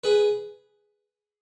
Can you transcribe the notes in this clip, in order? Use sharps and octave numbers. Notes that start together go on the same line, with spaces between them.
G#4 B4